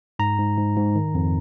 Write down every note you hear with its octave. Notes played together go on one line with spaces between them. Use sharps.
G#2 A#5
G#2
G#2
G#2
D#3
F2